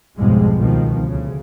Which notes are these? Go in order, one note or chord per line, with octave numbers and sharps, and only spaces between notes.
B1 F2 G#2 F3 G3 G#3
C#2 B2 D#3 F3
D2 C#3